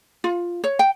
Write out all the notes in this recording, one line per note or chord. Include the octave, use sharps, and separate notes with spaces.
F4
C#5
G5